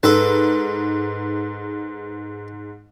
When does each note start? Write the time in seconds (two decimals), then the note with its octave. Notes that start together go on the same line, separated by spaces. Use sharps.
0.03 G#2 A4 B4 A5